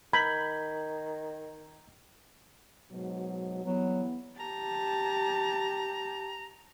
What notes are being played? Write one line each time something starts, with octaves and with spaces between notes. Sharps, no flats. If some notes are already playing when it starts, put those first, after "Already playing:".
D#3 A#5 B5 G6 G#6
G#2 B2 F#3
E3 F#3 G3 B3
G4 A5 A#5